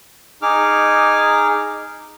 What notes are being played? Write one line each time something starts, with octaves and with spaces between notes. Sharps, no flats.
D#4 G#4 D6 F6